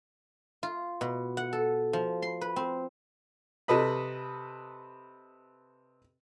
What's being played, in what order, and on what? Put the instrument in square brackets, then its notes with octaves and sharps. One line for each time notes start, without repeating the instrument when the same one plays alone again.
[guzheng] F4
B2
F#5
A4
F3
C6
B4
C4
[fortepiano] C3 A4 B4 D#5 B5